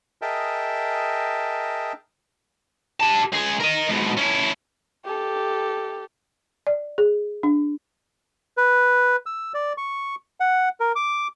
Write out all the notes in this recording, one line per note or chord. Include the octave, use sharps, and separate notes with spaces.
G#4 A#4 D#5 E5 G5 A5
G4 A5
C#2 G#4
A#4 D#5
G#2 B2
C#4 E4
G4 A4
D5
G#4
D4
B4
E6
D5
C#6
F#5
A#4
D6